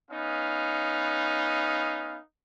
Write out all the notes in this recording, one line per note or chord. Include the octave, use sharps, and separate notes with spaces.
B3 C#4 D#4 F5